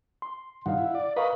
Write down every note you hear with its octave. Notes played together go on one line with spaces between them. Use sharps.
C6
G2 D#3 F5 F#5
E4
D5
A#4 B4 D#5 F5 B5 C#6